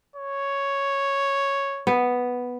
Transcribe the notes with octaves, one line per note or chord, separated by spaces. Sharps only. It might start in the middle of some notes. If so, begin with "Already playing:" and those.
C#5
B3